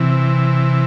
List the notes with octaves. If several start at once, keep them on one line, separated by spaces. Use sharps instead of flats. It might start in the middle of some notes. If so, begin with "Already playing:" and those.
Already playing: C3 E3